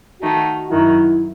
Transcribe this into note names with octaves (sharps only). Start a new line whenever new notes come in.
D#3 A3 D#4 F#4
F#2 D#3 F#3 E4